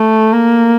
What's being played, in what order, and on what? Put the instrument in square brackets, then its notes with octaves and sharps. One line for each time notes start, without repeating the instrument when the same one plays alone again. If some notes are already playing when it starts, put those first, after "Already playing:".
Already playing: [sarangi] A3
A#3